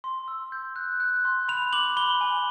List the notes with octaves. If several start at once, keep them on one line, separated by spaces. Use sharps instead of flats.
C6
E6
G6
F#6
F#6
C6
B5 F7
D6 F#7
B5 G7
G#5